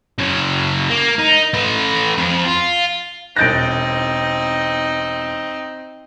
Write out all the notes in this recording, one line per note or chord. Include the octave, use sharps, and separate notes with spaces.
C#3 F#3
A#3
D#4
A3 B4
F2 F3
F4
E1 C4 D#4 F#6 G6 A6 A#6 D7